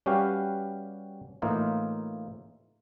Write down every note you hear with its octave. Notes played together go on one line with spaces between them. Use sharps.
G3 C#4 F#4 G4 B4 F5
A2 E3 A#3 D#4 F4